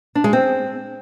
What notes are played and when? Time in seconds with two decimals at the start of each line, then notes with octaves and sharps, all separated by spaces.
0.15 D4
0.24 G#3
0.33 C4